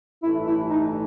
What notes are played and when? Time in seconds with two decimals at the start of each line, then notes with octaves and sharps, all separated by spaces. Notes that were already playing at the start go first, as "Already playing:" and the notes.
0.23 A1 G2 E3 A3 E4
0.47 E4
0.70 D#4